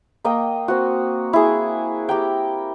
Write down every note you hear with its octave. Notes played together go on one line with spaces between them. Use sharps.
A#3 D#5 G5
C4 F#4
E4 G#4
G4 A#4 G5